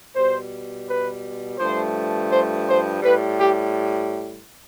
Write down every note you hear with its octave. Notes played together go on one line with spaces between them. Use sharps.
B2 G3 C5
B4
G2 F3 A3 C5
C5
C5
A2 G3 B4
G4